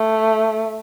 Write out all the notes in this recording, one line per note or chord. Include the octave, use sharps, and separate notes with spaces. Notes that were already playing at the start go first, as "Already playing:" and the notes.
Already playing: A3